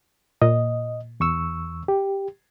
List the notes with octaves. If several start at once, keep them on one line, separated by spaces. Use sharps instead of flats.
A#2 D#5
E2 C#6 E6
G4